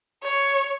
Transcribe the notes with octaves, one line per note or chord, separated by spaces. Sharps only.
C#5